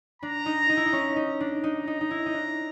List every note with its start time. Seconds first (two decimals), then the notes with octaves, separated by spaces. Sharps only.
0.22 D4 A#5
0.46 D#4
0.69 D#4
0.77 E4
0.86 D#4
0.93 C#4
1.16 D#4
1.40 D4
1.64 D#4 A#5
1.87 D#4
2.01 D#4
2.11 E4
2.26 D#4
2.34 D4